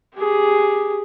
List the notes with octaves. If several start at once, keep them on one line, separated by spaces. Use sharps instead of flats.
G4 G#4